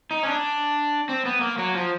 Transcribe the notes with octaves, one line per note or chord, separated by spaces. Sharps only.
D#4
C#4
D4
C4
B3
A#3
F#3
F3